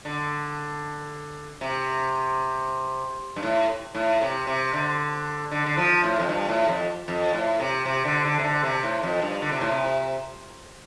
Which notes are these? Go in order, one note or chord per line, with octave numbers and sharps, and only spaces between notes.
D3
C3
G2
A2
A2
C3
C3
D3
D3
D3
F3
A2
F2
G2
A2
F2
F2
A2
C3
C3
D3
D3
C3
D3
C3
A2
F2
G2
D3
C3
A2
C3